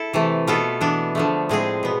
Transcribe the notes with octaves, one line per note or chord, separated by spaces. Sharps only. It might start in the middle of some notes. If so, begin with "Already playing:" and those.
Already playing: E4 A4
C3 E3 A3
B2 B3 F4 A4
E3 B3 D4
D3 F3 A3
A2 G#3 C4 G#4
B2 B3